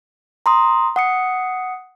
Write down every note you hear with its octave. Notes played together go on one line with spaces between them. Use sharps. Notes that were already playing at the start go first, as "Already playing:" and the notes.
A#5 C6 D#6
F#5 D#6 C#7